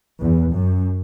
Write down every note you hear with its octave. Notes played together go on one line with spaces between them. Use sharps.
E2
F#2